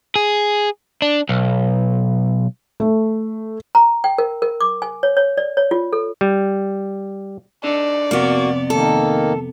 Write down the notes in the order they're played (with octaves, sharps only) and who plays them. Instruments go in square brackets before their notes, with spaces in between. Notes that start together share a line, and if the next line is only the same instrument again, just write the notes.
[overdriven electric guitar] G#4
D4
B1
[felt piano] A3
[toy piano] A#5
G5
A#4
A#4
D6
G#5
C#5
C#5
D5
C#5
F4
A4
[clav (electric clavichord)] G3
[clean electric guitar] D4 D#4 A4 [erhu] D5
[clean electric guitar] F2 C3 B3 [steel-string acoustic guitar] A#3 F#4
[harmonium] D#3 A#3 [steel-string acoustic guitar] A4